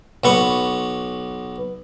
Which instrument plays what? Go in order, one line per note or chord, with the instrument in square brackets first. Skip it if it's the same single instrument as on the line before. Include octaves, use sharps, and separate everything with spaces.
[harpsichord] B1 B3 C#6